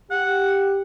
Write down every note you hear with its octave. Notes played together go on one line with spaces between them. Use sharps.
G4 F#5